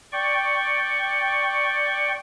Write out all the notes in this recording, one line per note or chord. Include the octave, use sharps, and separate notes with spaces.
D5 G5 C#6